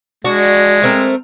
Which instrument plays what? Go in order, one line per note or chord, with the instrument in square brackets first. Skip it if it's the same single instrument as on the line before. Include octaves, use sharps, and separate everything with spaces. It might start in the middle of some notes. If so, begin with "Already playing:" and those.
[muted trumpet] G#3 [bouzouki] D4 F#4
[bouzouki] A3 C4 A#4